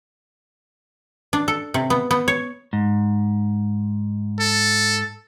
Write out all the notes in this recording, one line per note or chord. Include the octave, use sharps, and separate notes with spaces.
D4
A4
C3
B3
B3
C#5
G#2
A4